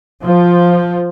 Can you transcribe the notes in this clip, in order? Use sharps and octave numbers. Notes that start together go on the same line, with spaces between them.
F3